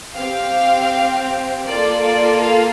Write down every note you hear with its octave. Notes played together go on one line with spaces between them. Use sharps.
C4 G4 F5
A#3 F4 A4 D5
D5
F5